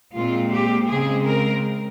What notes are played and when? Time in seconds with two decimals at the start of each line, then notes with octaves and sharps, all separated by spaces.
0.15 A#2 G#3 C4 F4
0.52 G4
0.89 C#3 G#3 C4 G#4
1.26 A#4